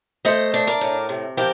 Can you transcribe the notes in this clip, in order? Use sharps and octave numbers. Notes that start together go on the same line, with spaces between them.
A3 C5 D#5
D4
A#4 D5
A2
C3
F3 G4 A#4